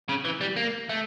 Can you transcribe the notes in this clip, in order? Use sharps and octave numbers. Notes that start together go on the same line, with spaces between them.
C#3
E3
G3
A#3
A3